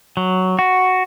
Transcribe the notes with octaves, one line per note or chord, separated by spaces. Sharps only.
F#3
F#4